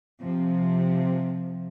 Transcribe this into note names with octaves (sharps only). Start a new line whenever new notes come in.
C3 F3